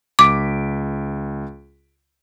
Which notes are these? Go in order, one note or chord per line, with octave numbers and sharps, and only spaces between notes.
C#2 D6 B6 D7